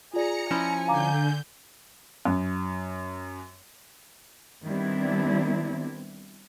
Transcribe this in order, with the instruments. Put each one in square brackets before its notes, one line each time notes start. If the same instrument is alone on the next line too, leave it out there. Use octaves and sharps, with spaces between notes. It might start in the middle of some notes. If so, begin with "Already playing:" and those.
[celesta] F4 D5 [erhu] G#4 [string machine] A#5 C#7
[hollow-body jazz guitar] F3 C#4 E4 [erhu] G#5
[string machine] D3 G6 [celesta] F5 A#5 D6
[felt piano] F#2
[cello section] D#3 G3 B3 C4 D4 E4